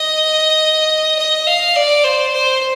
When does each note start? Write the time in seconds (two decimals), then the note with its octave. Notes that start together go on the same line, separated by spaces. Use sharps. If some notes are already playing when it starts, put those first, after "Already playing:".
Already playing: D#5
1.19 D#5
1.47 F5
1.76 D5
2.04 C5
2.33 C5